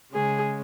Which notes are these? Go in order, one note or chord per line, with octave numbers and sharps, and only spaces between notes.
C#3 G#3 C#4 G#4